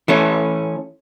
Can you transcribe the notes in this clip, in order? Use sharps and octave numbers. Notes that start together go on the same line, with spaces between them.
E3 A3 C#4